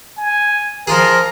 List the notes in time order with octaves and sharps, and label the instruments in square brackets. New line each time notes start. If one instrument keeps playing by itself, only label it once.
[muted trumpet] G#5
[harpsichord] F3 F4 G#4 [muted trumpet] A#4